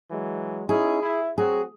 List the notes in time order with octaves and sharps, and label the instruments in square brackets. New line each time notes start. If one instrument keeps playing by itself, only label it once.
[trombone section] E3 F#3 G#3
[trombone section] C#4 D#4 E4 [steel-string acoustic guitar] G#4
[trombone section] E4
[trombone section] F#3 C4 F#4 [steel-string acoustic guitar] G#4